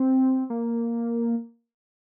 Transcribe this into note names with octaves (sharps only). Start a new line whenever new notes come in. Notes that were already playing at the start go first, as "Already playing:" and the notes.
Already playing: C4
A#3